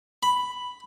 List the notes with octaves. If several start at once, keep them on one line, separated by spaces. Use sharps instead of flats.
B5